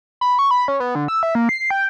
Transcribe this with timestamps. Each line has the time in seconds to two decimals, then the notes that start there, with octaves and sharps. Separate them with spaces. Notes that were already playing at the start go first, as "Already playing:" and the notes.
0.21 B5
0.39 C#6
0.51 B5
0.68 C#4
0.80 B3
0.95 D3
1.08 E6
1.23 E5
1.35 A#3
1.49 C7
1.71 G5